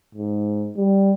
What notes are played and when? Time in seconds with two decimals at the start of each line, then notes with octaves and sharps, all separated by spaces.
0.15 G#2
0.77 G3